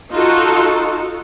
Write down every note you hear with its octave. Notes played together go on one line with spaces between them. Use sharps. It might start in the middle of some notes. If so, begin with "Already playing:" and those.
D#4 F4 F#4 A4